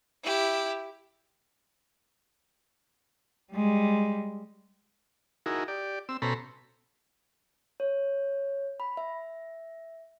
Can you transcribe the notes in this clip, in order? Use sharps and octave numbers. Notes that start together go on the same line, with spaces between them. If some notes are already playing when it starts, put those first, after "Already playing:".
E4 G4
G3 G#3
D#4 E4 F#4 G#4 A#4
G4 D5
C4 E6
B2 C#4 A4 C5 A#5 B5
C#5
B5
E5